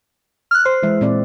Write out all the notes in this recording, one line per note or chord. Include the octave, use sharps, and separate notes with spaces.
F6 F#6
C5
E3 G#3 E5
A#2 C4 D5